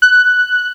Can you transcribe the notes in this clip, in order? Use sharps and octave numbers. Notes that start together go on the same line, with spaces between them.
F#6